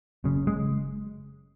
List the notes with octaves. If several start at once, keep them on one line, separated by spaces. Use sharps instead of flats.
F#1 F#2 C#3
G#3